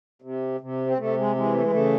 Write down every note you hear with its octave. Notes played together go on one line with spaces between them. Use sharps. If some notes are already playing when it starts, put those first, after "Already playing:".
C3
C3
C4
C3 A3
G#3
E3 G#3
A3
G#3
C#3 A3